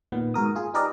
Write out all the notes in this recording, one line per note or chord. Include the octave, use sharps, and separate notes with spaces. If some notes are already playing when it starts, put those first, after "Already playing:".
A#2 D#3 B3
G#2 F#4 A#4 D#6
F4 G#4
D#4 G4 A#4 B4 D5 D#5